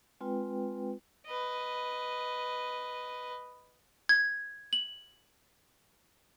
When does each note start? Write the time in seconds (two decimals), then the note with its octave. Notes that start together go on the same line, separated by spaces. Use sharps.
0.21 G#3 C4 F4 B4 G5
1.26 B4 D#5
4.09 G#6
4.73 F#7